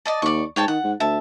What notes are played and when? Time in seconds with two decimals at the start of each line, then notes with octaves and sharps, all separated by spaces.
0.05 D5 D#5 A5
0.22 D#2 D5 C#6
0.56 G#2 C#5 G5 A5
0.68 D#3 F#5
0.84 G#2
1.00 D2 E5 A5